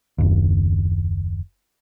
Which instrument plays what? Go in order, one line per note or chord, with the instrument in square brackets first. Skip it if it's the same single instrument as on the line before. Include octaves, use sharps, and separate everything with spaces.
[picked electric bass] F#1 D#2